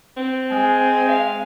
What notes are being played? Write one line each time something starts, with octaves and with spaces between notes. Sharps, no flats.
C4
G#3 G#5
F5